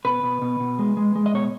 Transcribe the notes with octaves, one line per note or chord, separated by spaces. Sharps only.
B2 B4
B2
B2
B2
G#3
G#3
G#3
D#5
B2 C#5